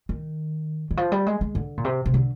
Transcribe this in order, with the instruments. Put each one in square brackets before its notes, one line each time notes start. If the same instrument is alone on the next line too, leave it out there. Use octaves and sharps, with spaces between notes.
[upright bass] D#3
D#3
F3
G3
G#3
G#3
D3
A#2
C3
C3
D3